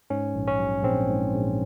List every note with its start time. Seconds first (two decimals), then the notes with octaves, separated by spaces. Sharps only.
0.10 G#2 C#4
0.35 A#1
0.47 C#4
0.59 F#3
0.84 A#1 C4
1.09 G#2
1.34 A#1